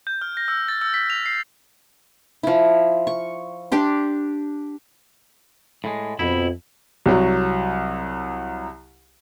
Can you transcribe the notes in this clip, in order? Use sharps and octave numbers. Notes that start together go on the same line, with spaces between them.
G6
F6
A#6
E6
A6
E6
B6
F7
C7
F3 E4
C#6
D4 G4 C6
A2 G#3
F2 B2 E4
C2 F#3